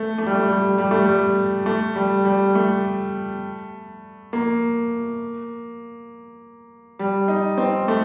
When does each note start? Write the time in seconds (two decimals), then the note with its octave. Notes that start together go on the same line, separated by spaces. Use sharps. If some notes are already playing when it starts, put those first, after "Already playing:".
Already playing: A3
0.18 A3
0.26 G3
0.35 A3
0.48 G3
0.78 G3
0.91 A3
1.06 G3
1.66 A3
1.96 G3
2.25 G3
2.55 A3
4.33 A#3
6.99 G3
7.28 D#4
7.58 C4
7.88 A3